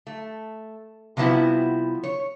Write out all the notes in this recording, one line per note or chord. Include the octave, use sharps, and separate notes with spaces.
A3
C3 F3 G3 B3 E4 F#4
C#5